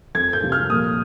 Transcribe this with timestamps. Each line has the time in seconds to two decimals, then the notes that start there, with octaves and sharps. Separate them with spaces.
0.15 F2 G#6
0.33 G6
0.42 C3 F3
0.52 F6
0.70 A#2 D#6